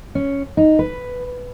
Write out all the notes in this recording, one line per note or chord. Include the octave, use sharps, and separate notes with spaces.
C#4
D#4
B4